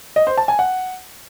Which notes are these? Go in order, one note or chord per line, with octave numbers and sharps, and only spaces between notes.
D#5
C5
A5
G#5
F#5